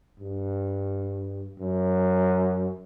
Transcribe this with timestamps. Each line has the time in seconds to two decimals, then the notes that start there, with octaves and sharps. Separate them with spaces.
0.20 G2
1.60 F#2